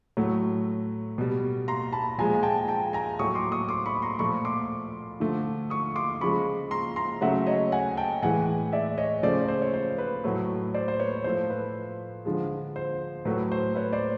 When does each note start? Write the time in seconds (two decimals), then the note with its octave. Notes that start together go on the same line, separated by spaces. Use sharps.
0.17 A2 F#3 A3
1.18 B2 G3
1.68 A#5 C6
1.92 A5 B5
2.18 A#2 F3 G#3 G#5 A#5
2.35 G#5
2.43 G5 A5
2.68 G5 A5
2.93 G#5 A#5
3.19 A2 F#3 A3 C#6 D#6
3.35 C6 D6
3.52 C#6 D#6
3.69 C6 D6
3.86 B5 C#6
4.02 A#5 C6
4.19 A#2 F3 A3 B5 C#6
4.45 C6 D6
5.20 D3 F3 A3
5.70 C#6 D#6
5.95 C6 D6
6.21 C#3 F3 G#3 B5 C#6
6.71 A#5 C6
6.96 A#5 C6
7.21 C#3 F#3 A3 E5 F#5
7.47 C#5 D#5
7.72 F#5 G#5
7.97 G5 A5
8.22 A2 E3 G#3 F#5 G#5
8.73 D5 E5
8.98 C#5 D#5
9.23 C#3 F3 A3 C5 D5
9.48 C5
9.62 C#5
9.74 C5
9.98 B4
10.24 A2 F#3 A3
10.74 C5 D5
10.88 C5
11.00 B4 C#5
11.24 A2 F3 A3 C5
11.50 B4
12.25 D3 F3 G#3
12.76 C5
13.25 A2 F#3 A3 B4
13.52 C5
13.76 B4 C#5
13.93 C5 D5